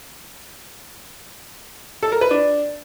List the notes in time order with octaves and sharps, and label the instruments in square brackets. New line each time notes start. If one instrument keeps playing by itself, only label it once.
[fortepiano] A4
A#4
B4
D4